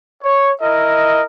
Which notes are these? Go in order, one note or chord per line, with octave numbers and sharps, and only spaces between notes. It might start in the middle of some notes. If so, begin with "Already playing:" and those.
C#5
E4 A#4 D#5